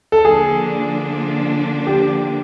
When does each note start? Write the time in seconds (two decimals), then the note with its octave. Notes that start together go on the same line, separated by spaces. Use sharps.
0.12 A4
0.24 D3 F3 A#3 D4 G#4
1.87 G4